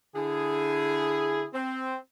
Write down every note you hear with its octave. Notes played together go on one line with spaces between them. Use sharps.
D3 E4 G#4
C4